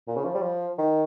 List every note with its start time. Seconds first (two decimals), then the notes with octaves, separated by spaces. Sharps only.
0.08 A#2
0.17 C#3
0.25 F3
0.35 G3
0.42 F3
0.78 D#3